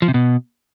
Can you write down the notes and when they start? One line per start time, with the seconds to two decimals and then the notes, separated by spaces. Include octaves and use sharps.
0.02 F3
0.08 C3
0.14 B2